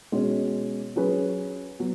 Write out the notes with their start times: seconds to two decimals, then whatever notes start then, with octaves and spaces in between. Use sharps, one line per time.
0.12 B2 G#3 C#4 F#4 C#5
0.96 F#3 C#4 G#4 B4
1.79 F#3 B3